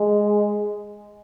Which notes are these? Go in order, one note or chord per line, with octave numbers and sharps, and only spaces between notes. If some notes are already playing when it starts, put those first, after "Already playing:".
Already playing: G#3